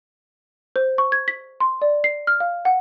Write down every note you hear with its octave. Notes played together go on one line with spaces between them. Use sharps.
C5
C#6
G#6
B6
C6
D5
C7
F6
F5
F#5